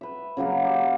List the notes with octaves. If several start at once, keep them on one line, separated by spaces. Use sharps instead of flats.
B4 E5
C#3 F#3 A#3 F5
G4